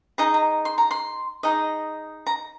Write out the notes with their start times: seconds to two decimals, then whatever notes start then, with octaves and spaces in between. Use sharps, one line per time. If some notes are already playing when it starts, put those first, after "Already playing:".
0.18 D#4 G#4 D#5 A#5
0.34 A#5
0.65 C6
0.78 A#5
0.91 C6
1.43 D#4 G#4 D#5
2.27 A#5